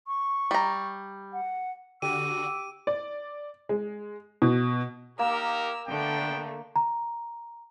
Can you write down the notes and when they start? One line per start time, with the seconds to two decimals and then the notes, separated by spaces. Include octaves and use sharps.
0.07 C#6
0.51 G3 A#5
1.33 F#5
2.02 D3 F#4 G4 D6 E6 D#7
2.87 D5
3.69 G#3
4.42 B2
5.19 A#3 D#4 G4 A#4 E6
5.87 D3 A3 B3 D4 G5
6.76 A#5